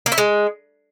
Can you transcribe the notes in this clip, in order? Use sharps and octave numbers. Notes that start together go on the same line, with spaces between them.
A#3
E4
G#3